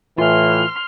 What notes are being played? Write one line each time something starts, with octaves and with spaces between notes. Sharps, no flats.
A2 E3 F4 C6 F6